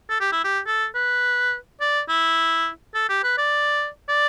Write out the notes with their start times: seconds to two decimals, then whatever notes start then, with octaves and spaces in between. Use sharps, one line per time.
0.09 A4
0.20 G4
0.32 E4
0.44 G4
0.66 A4
0.95 B4
1.81 D5
2.09 E4
2.94 A4
3.09 G4
3.23 B4
3.38 D5
4.09 D5